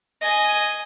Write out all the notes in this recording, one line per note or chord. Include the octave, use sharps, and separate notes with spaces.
D#5 G#5